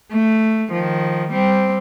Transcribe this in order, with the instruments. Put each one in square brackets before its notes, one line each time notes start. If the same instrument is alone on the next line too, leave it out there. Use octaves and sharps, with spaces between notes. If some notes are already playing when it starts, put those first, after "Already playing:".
[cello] A3
D#3 F3
G3 C4